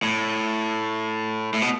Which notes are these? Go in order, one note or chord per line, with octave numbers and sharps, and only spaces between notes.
A2
A2
B2